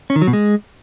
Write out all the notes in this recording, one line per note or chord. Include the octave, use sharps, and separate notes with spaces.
C#4
D#3
F#3
B2
G#3